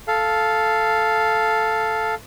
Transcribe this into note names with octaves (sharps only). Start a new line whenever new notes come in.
A4 F5